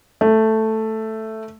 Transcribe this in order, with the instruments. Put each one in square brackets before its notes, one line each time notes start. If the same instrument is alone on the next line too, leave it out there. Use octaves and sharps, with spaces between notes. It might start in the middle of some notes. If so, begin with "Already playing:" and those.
[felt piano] A3